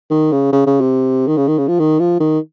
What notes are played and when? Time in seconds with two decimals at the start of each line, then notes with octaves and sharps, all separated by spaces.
0.11 D#3
0.32 C#3
0.53 C#3
0.67 C#3
0.81 C3
1.28 D#3
1.37 C#3
1.48 D#3
1.58 C#3
1.68 F3
1.79 D#3
2.00 F3
2.20 D#3